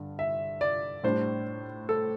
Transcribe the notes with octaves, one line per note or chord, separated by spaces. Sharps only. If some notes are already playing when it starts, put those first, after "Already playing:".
Already playing: G2 D3
E5
D5
A2 G3 D4 C5
A4